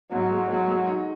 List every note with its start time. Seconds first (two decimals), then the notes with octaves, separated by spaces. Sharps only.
0.11 G#2 F#3
0.30 G#3
0.49 F#3 G#3
0.67 G#3
0.86 D#4